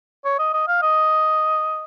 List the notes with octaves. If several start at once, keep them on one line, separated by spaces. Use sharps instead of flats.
C#5
D#5
D#5
F5
D#5